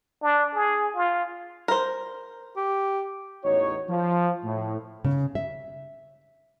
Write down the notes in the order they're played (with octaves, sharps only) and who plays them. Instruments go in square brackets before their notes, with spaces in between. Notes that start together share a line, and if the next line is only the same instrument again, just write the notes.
[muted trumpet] D4
G#4
F4
[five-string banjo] A#4 C5
[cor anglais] G4
[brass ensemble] A1 E2 D#4 F#4 C#5
F3
A2
[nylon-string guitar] C#3
E5